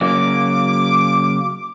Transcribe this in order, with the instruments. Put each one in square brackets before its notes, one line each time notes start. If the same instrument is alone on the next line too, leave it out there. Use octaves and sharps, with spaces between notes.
[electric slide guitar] C#3 F#3 A#3 [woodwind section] D6